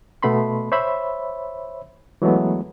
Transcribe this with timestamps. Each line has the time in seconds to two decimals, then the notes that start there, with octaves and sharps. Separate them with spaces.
0.23 B2 A3 B3 B5 C6
0.72 C5 C#5 E5 B5
2.22 E3 F#3 G#3 A3 B3